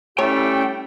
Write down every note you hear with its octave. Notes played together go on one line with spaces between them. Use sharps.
G3 A3 C#4 E4 G4 C#5 G5